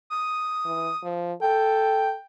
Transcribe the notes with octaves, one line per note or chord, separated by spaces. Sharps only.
D#6
E3
F3
A4 G5